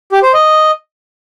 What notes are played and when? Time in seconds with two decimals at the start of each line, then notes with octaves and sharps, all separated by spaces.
0.12 G4
0.23 C5
0.34 D#5